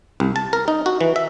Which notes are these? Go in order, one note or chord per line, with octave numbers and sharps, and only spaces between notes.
C2
A5
A#4
D#4
F#4
E3
E5